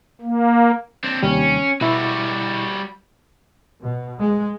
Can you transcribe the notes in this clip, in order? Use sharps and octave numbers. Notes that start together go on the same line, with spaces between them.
A#3
C4 D4
D#2 C3 G3 C#4
B2 G3 E4 F#4
B2
G#3